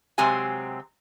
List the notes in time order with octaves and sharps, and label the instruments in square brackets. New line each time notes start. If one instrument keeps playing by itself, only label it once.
[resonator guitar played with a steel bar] C3 F#3 G#3 C4 G4 G#5